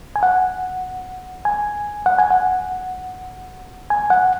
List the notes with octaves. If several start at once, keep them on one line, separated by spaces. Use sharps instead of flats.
G#5
F#5
G#5
F#5
G#5
F#5
G#5
F#5